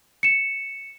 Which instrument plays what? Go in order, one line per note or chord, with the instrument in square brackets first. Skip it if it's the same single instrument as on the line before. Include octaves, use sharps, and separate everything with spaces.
[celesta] C#7 E7